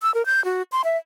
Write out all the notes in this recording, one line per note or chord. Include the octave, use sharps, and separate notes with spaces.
E6
A#4
G6
F#4
C6
E5